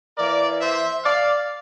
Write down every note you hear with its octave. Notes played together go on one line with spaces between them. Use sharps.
E3 A#3 A#4 D5
C5 E5
D5 F5